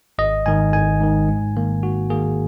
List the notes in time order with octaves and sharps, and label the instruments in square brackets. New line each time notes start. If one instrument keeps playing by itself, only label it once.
[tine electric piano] G#1 D#5
G#2 D#3 G#5
G#1 G#5
G#2 D#3
G#2
D#3 A#3
G#2 F#4
D#3 A#3 G#4